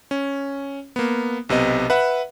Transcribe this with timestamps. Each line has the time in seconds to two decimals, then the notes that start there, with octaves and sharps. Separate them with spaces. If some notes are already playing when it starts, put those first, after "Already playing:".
0.11 C#4
0.96 A#3 B3
1.49 B1 C3 B3 D#5
1.90 B4 E5 F#5